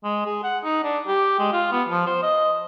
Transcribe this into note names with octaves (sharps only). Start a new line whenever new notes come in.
G#3
G#4
F#5
D#4
D4
G4
G#3
F4
B3
F3
C5
D#5